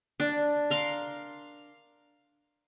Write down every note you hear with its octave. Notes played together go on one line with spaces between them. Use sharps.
D4
A#4 F5 C6